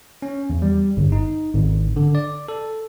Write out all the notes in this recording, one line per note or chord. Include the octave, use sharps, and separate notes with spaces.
C#4
E2
G3
G1
D#4
G#1
D3
D5
A4